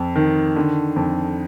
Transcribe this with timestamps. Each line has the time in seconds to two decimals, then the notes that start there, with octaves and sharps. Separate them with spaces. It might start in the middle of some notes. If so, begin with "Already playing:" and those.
Already playing: F2
0.16 D#3
0.56 D3
0.96 F2